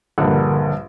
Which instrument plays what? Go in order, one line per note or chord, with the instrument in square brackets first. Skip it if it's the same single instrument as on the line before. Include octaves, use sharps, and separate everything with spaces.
[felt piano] A#1 G2 [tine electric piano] D3 A#4 F#5